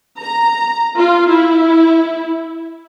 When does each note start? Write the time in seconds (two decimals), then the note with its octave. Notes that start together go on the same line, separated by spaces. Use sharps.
0.20 A#5
0.97 F4
1.30 E4